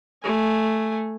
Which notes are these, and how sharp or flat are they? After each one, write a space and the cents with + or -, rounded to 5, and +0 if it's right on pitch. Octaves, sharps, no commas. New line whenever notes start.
A3 +0 G#5 +0